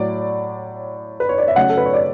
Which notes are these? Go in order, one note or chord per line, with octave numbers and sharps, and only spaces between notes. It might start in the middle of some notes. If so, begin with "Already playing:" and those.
Already playing: A2 F#3 A3 D5
B4
C#5
D5
E5
C#3 F#3 A3 C#4 F#5
A4
B4
C#5
D5